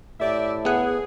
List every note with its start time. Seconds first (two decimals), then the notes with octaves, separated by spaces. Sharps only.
0.20 A2 G4 D5 E5
0.65 B3 G#4 F#5